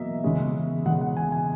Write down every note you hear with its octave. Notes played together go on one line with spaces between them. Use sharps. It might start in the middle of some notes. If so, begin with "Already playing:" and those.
Already playing: E2 B2 F#3 A#3 D#5 E5
E2 C#3 G#3 C#4
E2 C#3 G#3 C#4 F#5
F#5
G#5
G#5